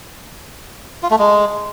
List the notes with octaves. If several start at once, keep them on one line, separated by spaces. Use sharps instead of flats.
F4
A3
G#3